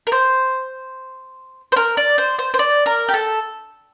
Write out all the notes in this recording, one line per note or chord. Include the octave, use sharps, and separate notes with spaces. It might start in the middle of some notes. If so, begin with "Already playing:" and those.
A#4
C5
C5
A#4
D5
C5
C5
C5
D5
A#4
G4
A4